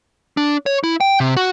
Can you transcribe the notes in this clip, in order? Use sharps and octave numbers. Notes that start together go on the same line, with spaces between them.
D4
C#5
E4
G5
C3
F#4